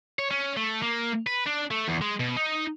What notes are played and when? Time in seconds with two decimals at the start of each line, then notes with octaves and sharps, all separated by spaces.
0.19 C#5
0.31 C#4
0.57 A3
0.82 A#3
1.26 B4
1.46 D4
1.71 A3
1.88 E2
2.02 G#3
2.20 B2
2.37 D#4